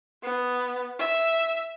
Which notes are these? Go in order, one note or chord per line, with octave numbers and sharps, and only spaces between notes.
B3
E5